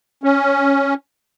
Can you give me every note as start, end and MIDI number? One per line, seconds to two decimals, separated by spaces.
0.24 0.94 61